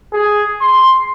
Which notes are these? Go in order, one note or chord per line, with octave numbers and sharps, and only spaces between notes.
G#4
C6